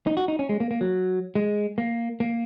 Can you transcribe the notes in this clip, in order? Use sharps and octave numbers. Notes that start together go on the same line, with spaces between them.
D#4
F#4
D#4
C#4
G#3
A#3
A#3
F#3
G#3
A#3
A#3